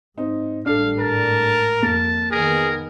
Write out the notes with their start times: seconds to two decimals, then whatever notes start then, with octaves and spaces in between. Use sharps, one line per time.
0.18 G#2 C4 D#4
0.66 G#1 A2 G3 D4 A4 F5
0.99 A#4 A5
1.82 F2 A#3 A5
2.31 D#3 B3 G#4 A#4